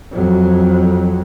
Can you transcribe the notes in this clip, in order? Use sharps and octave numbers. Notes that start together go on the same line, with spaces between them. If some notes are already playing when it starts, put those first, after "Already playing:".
F2 F#3